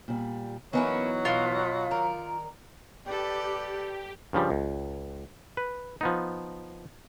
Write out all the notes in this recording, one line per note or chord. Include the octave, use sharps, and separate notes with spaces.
A#2 G3
E3 F#3 A#3 B3 C#4 D#4 E4
B2 F4 D#5 F5
D#3 A#4 D5
G4 A4 B4 D5
G2 C#3 F3 G3
C#2
B4
F3 B3 D#4